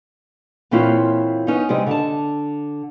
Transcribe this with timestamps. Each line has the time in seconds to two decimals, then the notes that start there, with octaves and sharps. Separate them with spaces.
0.71 A#2 E3 C4 C#4 E4 F4
1.47 B3 C#4 D#4
1.69 C3 G3 G#3 D#5
1.87 D3 A5